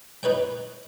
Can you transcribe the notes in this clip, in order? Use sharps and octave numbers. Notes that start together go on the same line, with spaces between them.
D#4 B4 C#5 G5